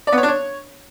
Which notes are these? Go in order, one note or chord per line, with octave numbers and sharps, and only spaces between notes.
D5
B3
C#5
D4
C#5